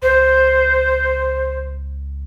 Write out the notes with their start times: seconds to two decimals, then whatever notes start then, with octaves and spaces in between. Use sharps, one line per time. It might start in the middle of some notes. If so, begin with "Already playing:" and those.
0.02 C#2 C5